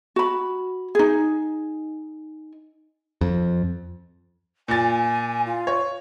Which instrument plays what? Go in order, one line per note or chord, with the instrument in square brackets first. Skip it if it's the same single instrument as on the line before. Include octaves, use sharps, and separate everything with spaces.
[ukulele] F#4 B5
D#4 G#4
[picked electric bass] F2
[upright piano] A#2 A6 [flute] G#5
[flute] F4
[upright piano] C#5